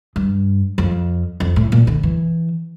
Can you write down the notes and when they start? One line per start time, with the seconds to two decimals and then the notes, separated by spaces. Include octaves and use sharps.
0.16 G2
0.78 F2
1.40 F2
1.56 A2
1.72 A#2
1.87 D3
2.03 E3